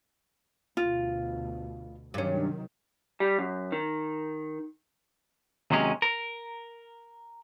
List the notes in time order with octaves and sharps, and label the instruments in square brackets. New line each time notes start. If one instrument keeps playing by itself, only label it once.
[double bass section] D2 B2 [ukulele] F4
[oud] G2 C#4 [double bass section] C3 D#3 F#3
[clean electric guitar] G3
F#2
D#3
D#2 C3 F#3 G#3 C#4
A#4